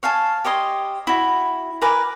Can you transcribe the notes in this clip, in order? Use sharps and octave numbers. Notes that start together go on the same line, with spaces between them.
C#5 F5 G#5 A5
G4 C#5 D#5 C6
E4 F#4
A#4 B4 G#5 D6